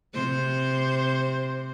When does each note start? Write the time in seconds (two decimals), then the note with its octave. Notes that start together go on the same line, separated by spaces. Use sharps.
0.14 C3 C5